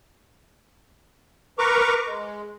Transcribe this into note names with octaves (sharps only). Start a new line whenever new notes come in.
A#4 B4 A#5 C#6 D6
G#3